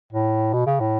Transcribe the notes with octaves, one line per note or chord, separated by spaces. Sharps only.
A2
B2
C#3
A2